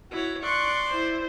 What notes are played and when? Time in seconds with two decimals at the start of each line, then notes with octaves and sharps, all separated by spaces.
0.11 E4 F#4 C#5
0.42 D5 C6 C#6 F#6
0.89 E4 C5